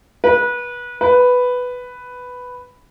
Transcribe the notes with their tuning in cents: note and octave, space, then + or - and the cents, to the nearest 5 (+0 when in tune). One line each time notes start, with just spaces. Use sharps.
B4 -25
B4 +5